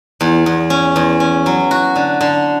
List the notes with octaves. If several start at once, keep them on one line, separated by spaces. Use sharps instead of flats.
E2
E2
C#4
E2
C#4
F#3
F#4
D3
D3